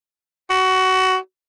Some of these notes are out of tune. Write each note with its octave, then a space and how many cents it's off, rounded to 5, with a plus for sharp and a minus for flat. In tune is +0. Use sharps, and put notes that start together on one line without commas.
F#4 +20